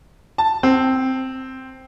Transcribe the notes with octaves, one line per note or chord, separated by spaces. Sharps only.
A5
C4